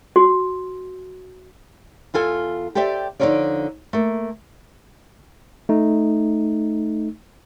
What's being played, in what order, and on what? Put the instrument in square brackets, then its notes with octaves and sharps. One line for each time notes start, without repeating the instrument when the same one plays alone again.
[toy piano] F#4
[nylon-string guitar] E2 F4 A4 G#5
G4 A4 C5 D5 E5 G5
D3 F3 D#4 F4 C#5 D5
A3 A#3
[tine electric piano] A3 D#4